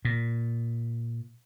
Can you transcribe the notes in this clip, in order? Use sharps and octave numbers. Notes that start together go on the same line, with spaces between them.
A#2